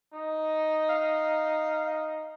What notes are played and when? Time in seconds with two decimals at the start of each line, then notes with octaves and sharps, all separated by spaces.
0.14 D#4
0.89 F5